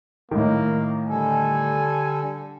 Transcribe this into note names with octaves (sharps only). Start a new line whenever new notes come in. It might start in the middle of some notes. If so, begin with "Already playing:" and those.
A2 D#3 A#3
D3 G3 A4 G#5